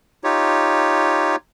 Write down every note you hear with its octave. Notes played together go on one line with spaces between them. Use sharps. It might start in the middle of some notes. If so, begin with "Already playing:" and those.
D#4 F4 G4 C#5